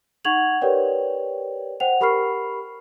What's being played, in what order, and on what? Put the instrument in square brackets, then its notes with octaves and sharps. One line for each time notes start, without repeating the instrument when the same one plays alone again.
[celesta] D#4 F#5 C#6 G#6 F7 F#7
G4 A#4 B4 C#5 D5 G5
C5 F#5 G5 F7
G4 A#4 B5 C#6 F6 C7